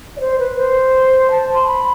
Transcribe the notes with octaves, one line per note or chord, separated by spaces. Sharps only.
D5
C5
B4
C5
A5
C6
B5